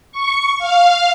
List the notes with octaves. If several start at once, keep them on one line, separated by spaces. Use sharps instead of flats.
C#6
F5